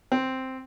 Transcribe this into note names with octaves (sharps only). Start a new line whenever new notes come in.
C4